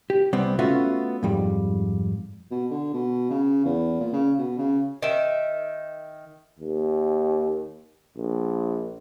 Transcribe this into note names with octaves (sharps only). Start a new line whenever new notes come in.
G4
C2 G3 B3 C4
A3 B3 C#4 F4 F#4 E5
F2 G#2 G3
B2
D3
B2
C#3
E2
A#2
C#3
B2
C#3
D#3 E5
D#2
A#1